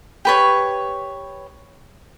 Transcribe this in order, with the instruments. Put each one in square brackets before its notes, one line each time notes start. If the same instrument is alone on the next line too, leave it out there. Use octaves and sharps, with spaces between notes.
[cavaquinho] G4 B4 C#5